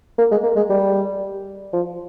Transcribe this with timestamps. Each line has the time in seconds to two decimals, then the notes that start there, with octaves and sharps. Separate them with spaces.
0.18 A#3
0.31 G#3
0.43 A#3
0.56 G#3
0.70 G3
1.73 F3